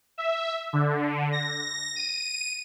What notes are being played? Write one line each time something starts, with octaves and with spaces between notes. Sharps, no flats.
E5
D3
A#6
D#7